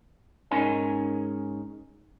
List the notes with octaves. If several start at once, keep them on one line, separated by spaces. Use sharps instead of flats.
G#2 C#4 D#4 A#4 C#5 G#5